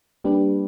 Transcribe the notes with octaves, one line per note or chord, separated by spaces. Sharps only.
G3 A#3 D4 G4 B4